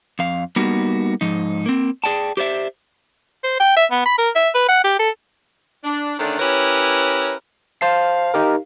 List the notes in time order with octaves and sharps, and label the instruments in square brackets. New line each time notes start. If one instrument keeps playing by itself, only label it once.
[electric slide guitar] F2 F5
G3 A#3 B3 D#4 F#4
G#2 F3 D#4
A#3 C4
G#4 D5 G5 A5
G4 C5 D5 E5
[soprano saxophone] C5
G5
E5
B3
B5
A#4
E5
B4
F#5
G4
A4
[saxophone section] D4
D3 D#3 A3 C#4 D4
C#4 E4 G4 A#4 B4 C#5
[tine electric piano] C5 A5 C7 [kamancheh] F5
[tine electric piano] D#4 G4 A#4